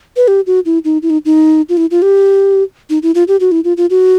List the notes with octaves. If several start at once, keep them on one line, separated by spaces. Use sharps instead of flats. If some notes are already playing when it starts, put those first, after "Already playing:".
B4
G4
F#4
E4
D#4
E4
D#4
D#4
F4
E4
F4
G4
D#4
E4
F4
G4
F#4
E4
F4
F4
F#4